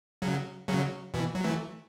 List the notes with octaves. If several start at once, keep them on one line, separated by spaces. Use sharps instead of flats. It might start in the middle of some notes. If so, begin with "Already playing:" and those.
C#3 F#3
C#3 F#3
B2 E3
F#3
E3 A3